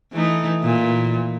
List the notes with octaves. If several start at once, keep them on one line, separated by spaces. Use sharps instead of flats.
E3 A3 D#4
A#2 E3